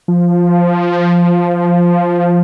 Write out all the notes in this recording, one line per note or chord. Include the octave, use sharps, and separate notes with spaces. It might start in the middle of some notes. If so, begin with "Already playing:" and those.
F3